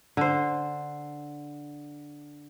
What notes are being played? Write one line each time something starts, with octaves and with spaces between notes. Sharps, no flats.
D3 C5